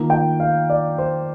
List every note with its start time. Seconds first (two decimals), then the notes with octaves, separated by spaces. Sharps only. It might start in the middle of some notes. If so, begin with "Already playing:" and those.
Already playing: D#3 A#3 F4
0.10 G5
0.40 F5
0.70 D5
0.98 C5